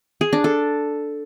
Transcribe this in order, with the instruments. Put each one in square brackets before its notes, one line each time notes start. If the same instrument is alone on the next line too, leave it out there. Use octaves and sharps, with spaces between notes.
[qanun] G#4
D4
A4